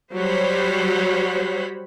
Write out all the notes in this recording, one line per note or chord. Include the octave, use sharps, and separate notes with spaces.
F#3 G3 C5 C#5 F#5 B5